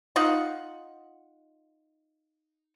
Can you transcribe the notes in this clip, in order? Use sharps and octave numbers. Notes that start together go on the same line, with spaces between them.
D#4 F4 F#5